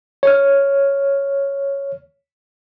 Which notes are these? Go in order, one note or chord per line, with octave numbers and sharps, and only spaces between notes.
C#5 F6